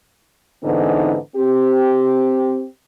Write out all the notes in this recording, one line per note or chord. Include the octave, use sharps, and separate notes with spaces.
G#2 D3 E3 B3 C4 D#4
C4 G4